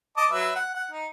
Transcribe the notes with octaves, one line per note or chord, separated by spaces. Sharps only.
D#5 A5 D6
F#3 B4 E5
F#5
F#5
D#4